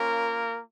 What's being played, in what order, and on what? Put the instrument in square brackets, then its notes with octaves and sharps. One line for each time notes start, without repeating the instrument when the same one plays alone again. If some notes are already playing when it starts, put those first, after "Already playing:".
Already playing: [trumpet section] A#3 C#4 F4 A#4